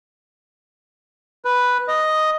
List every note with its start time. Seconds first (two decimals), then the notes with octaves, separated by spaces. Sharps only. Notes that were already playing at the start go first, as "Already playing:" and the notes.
1.45 B4
1.88 D#5